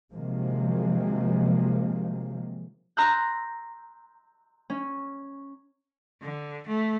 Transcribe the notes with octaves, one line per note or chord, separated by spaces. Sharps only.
C3 D#3 F3 F#3 G#3 A#3
A#5 C6 E6 F#6 G6
C#4
D3
A3